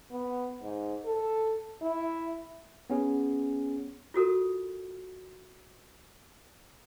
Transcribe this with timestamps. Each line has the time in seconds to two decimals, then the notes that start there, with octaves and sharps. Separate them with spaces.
0.11 B3
0.62 G#2
1.05 A4
1.82 E4
2.90 B3 C#4 G#4
4.14 F4 F#4 A4 A#4